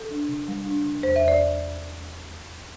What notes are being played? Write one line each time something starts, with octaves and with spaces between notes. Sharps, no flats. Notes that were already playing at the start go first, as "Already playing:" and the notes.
Already playing: A4
D4
C3
G3
D4
C3
E2 C5
E5
E2
D5